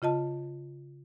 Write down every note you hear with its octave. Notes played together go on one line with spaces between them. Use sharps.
C#3 F4 D#5 A5